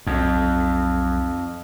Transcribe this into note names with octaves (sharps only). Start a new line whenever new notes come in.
B1 F2